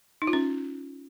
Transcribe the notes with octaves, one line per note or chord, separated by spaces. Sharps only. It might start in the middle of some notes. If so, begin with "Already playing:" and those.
D#4
F4
C#4